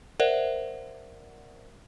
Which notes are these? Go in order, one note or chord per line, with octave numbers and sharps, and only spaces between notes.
A#4 C5 D5 E5 F#5